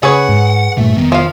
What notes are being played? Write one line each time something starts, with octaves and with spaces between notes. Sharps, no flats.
C#3 G#4 B4 C#5 F#5
G#2
G2 A#2 C#3 A3
F1 D#3 G3 B3
F3 F5